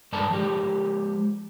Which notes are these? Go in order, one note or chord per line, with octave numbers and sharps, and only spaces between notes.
G2 G#3 A4 B4 D5 A5
F3 G#3 G4